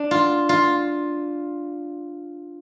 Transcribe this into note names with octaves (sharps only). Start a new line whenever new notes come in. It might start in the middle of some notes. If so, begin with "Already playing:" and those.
Already playing: D4
F4
F4